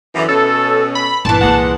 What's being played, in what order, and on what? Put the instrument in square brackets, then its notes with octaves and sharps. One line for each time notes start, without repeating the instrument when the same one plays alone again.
[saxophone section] F#2 D3 E3
[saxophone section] B2 C#4 [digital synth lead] A4
[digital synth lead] B5
[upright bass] G1 [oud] A#2 E3 [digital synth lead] A5
[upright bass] C2 A#3 [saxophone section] G#3 F#5